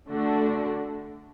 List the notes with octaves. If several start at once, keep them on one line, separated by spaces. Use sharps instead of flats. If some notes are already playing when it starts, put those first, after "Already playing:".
D3 A3 D4 F#4